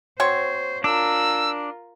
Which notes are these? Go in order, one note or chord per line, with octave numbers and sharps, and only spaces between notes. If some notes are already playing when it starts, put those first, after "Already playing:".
C4 F#4 C5 C#5
D4 F4 A#4 E6